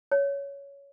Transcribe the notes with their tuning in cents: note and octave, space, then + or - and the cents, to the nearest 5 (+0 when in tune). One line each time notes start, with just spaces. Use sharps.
C#5 +15